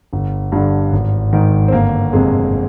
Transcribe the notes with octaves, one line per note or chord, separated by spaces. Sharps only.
G1
G2 D3
G#1
G#2 D#3
C4
G1 A#3
F2 C3 G#3